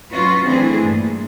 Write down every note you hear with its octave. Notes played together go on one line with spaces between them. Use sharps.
F#3 C#4 F4 F#4 B4
E3 A3 C4 D4 G#4
G2 A#2